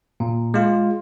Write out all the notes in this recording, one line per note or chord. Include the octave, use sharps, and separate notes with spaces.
A#2
G#3 F4